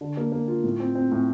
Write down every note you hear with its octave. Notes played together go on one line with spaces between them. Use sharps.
D3
A#3
A#3
F4
A2
C4
C4
A2